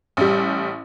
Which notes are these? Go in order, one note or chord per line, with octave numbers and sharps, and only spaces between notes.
A1 G3